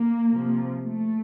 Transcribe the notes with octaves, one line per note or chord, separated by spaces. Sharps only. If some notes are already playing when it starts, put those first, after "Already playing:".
Already playing: A#3
C3 F3
A3